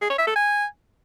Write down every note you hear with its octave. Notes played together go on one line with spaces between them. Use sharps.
G#4
C#5
E5
A4
G#5